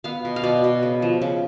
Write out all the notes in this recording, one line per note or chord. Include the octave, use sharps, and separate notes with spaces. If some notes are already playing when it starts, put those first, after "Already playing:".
B3 F5
B2
F5
B2 D5
B2
C#3
F3
C#3